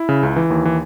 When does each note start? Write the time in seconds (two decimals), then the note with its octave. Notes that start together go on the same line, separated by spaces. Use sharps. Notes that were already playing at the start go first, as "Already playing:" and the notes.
Already playing: E4
0.09 C#3
0.23 C#2
0.36 E3
0.50 D#2
0.65 E3